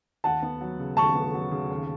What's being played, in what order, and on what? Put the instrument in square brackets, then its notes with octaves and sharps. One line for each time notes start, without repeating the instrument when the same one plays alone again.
[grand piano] D#2 [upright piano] F#5 A5
[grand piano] B3
F#3
C#3
[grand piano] D#2 [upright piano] A5 C#6
[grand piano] B3
F#3
C#3
D#2